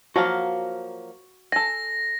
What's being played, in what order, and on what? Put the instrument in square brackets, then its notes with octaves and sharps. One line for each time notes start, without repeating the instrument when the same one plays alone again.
[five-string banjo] F3 F#3 A#3 [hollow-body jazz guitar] F#4 F5
[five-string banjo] A4 G#5 [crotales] A#6